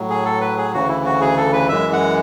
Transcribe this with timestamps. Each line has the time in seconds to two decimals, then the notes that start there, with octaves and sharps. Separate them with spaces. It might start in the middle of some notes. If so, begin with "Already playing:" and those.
Already playing: A2 F#3
0.10 G#4
0.25 A4
0.41 B4
0.57 G#4
0.73 D2 C#3 E3 F#4
0.89 E4
1.05 F#4
1.21 G#4
1.37 A4
1.53 B4
1.69 F#2 E3 G#3 E5
1.93 F#5